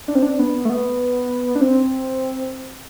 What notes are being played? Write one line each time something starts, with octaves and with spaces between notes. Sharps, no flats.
D4
C4
D4
B3
A3
B3
D4
C4